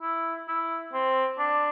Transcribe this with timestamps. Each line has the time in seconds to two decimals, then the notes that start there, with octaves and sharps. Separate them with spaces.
0.02 E4
0.48 E4
0.93 C4
1.38 D4